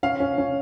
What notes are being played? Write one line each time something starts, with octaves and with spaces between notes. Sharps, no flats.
C#4 F5
C#4
C#4